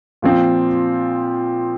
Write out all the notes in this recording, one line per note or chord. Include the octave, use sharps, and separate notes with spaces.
A#2 F3 C4 F4